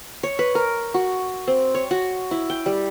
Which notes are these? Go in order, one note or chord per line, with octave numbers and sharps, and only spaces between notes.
C#5
B4
A#4
F#4
C4
C#5
F#4
E4
G5
G3